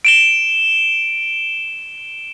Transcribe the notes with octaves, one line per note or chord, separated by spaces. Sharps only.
D7 E7 G7